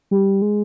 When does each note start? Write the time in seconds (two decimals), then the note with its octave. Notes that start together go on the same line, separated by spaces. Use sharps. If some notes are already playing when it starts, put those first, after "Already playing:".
0.11 G3
0.42 G#3